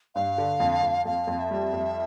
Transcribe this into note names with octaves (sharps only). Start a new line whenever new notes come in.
G2 F5
D3
F2
F2
F2 F5
F2
E5
G3
F2